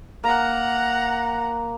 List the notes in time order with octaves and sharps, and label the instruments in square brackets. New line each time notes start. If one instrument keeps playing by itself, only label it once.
[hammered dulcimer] A#3 [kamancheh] F#5 A#5